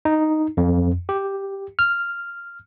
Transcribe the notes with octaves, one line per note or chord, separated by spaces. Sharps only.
D#4
F2
G4
F6